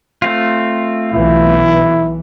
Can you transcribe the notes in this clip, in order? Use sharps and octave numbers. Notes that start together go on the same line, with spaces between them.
A3 C4 F4
B1 E3 E4